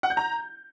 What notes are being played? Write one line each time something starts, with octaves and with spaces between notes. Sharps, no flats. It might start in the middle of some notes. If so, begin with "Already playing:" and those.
F#5
G6
A#5